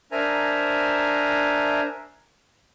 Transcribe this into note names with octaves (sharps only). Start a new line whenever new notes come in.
D4 A#4 C5 E5 G#5 A#5